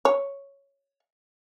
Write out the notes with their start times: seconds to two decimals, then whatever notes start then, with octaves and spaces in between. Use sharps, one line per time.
0.05 C#5